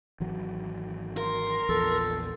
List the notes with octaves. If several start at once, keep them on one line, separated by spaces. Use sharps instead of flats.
G#1 E3 F#3
A#4 C6
A#1 E2 F3 A4